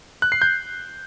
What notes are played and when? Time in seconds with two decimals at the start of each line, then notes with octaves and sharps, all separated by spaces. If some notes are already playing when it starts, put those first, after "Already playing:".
0.22 F#6
0.32 C7
0.42 G6